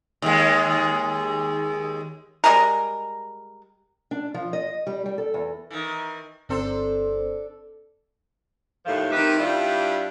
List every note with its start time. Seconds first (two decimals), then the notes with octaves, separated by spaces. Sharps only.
0.22 D#2 G#3
2.44 G3 G#3 G#4 A#4
4.11 D4
4.34 F3
4.53 D#5
4.87 G3
5.06 G3
5.18 A4
5.34 E2
5.71 D#3 E3
6.49 G1 C4 D4 A4 C5
8.86 D#2 A2 F3
9.11 D#3 C4 D#4 G4 B4 E5
9.38 G2 G3 D4 E4 F4